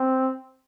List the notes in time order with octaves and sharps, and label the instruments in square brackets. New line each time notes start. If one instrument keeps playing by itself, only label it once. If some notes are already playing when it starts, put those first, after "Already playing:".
Already playing: [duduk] C4